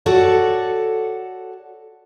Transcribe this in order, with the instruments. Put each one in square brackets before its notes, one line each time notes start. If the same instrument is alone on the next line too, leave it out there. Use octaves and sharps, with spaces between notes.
[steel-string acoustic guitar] F#4 A4 C#5 D5